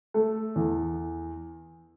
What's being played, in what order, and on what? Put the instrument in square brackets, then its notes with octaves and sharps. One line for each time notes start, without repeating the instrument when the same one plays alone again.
[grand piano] A3
E2